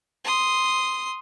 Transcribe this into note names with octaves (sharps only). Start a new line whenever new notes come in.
C6 D#6